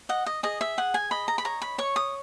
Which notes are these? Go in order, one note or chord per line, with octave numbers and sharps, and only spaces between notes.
D#5 F#5
D#5
G#4 D#5
E5
G#4 F#5
G#5
D#5 B5
A#5
B5
C#5 A#5
B5
C#5 C#6
D#6